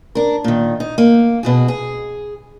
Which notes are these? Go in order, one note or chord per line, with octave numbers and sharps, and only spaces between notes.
D4 A#4
A#2 D#3
D#4
A#3
B2 F#4 G#4
G#4